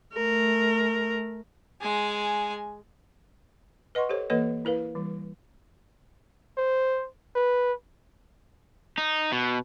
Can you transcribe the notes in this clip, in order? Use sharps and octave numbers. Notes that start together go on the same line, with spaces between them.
A3 A#4
G#3 G#5
B4 D#5 F#5 C6 C#6
G4 A4 C5 C#5
E3 A#3 A4 B4 C#5 D#5
E4 A#4 B4 F5
E3 G3
C5
B4
D#4
B2